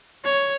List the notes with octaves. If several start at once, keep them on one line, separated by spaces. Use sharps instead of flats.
C#5